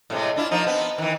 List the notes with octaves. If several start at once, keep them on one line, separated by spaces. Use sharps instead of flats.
A2 C3 G#3
D4 E4 F4
F3 A#3 D#4
B3 C4
D#3 E3